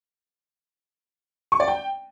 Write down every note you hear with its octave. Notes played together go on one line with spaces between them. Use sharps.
C#6
D5
G5